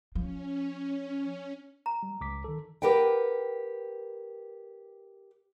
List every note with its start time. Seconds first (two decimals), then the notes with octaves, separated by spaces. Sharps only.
0.15 F3 C#4
1.86 A#5
2.03 G3
2.21 C#2 D6 B6
2.44 D#3 A4
2.82 G4 A#4 B4 F#5 G5